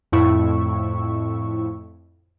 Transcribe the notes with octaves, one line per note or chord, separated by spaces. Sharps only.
F2 A2 E4 C#6 E6